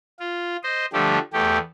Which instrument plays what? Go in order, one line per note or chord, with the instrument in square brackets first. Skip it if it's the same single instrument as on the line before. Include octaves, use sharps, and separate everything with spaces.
[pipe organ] F4
C5 D#5
D3 F3 G3 A3 G4
E2 A3 G4